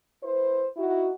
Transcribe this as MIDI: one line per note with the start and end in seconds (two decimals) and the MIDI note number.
0.23 0.66 64
0.23 0.66 71
0.23 0.66 72
0.77 1.10 63
0.77 1.10 64
0.77 1.10 66